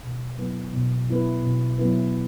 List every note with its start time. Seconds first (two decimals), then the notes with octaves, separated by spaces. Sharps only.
0.03 B2
0.38 F#3 B3 E4 B4
0.73 B2
1.08 F#3 B3 E4 B4
1.43 B2
1.78 F#3 B3 E4 B4